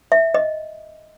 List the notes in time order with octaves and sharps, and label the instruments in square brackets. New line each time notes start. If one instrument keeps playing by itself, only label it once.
[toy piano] E5
D#5